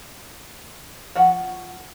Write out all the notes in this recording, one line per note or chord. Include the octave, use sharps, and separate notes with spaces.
F3 F#4 F#5